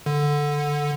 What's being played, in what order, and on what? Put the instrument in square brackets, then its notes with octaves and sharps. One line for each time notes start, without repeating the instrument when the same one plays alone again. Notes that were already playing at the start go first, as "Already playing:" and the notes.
[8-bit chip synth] D3